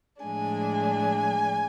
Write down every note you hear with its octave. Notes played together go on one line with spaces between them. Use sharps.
A2 F3 G#3 D4 G#5